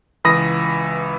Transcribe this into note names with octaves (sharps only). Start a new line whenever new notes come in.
C#2 E3 B5 D#6 A#6